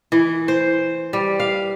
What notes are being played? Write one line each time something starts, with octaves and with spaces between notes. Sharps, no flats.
E3
C5
G3
F5